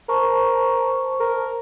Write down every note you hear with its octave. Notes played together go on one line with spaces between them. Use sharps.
A#4 C5 A5 C#6
A#4